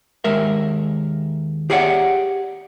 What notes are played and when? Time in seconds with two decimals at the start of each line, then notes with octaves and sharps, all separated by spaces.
0.24 D#2 G#3 A#4 E5
1.70 G4 G#4 C#5 D5 E5 F#5